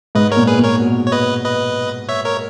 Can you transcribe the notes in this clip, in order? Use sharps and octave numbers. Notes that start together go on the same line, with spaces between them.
G#2 B4 D#5
A#4 C#5
A#2
G#4 B4
A#2
A#4 C#5
B2
C#5
B4 D#5
B4 D#5
C#5 E5
A#4 C#5